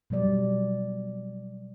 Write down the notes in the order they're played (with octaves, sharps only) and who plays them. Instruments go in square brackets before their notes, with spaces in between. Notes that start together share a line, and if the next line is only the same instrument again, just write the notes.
[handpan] B2 F#3 G3 D5